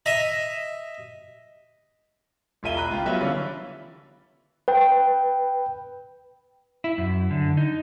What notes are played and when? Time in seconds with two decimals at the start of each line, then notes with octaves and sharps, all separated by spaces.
0.06 D#5 E5 A#5
2.63 E1 F4 E5 D#7 G7
2.77 A#5 B5 F#6
2.90 C#2 F4 G5
3.05 F#3 G3 B3 F4 B4 E5
3.20 D3 E3 C#4 D5 F5 B5
4.68 B4 G5
6.84 E4
6.98 F#2
7.31 D3
7.57 D#4